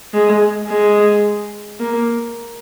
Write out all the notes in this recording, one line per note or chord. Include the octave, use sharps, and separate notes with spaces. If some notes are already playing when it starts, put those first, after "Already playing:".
G#3
G#3
A#3